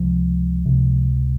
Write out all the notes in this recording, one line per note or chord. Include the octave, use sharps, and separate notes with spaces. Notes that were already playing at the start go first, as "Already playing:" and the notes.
Already playing: C#2 C3 F3
C#2 C3